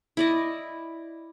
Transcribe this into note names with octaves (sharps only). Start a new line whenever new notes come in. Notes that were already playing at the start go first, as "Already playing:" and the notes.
E4 D5 D#5